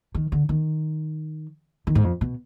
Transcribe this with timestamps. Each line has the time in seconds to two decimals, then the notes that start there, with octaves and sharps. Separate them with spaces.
0.14 D#3
0.32 D3
0.49 D#3
1.87 D#3
1.95 G#2
2.04 F2
2.21 B2